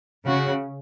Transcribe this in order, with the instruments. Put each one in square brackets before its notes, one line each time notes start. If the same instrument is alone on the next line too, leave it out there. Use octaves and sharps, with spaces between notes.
[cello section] C#3 [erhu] F#4